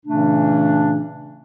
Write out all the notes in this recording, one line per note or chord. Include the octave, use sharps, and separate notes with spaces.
A#2 C#3 E3 A3 C#4 D4